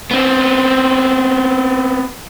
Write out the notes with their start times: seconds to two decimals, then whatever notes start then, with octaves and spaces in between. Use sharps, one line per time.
0.11 B3 C4